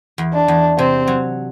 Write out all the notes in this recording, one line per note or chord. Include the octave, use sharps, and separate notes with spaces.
E2
D4
E2
C3 C4
F#3